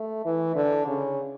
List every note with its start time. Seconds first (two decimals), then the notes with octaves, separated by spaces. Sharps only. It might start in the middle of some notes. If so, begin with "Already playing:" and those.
Already playing: A3
0.25 E3
0.56 D3
0.87 C#3